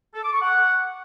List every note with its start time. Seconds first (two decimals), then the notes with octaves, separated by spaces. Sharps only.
0.14 A4
0.23 D6
0.33 C#6
0.42 F#5